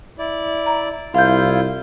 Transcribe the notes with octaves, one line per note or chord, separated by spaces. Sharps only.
E4 D5
A#5
C2 E4 F4 F5 C6 G6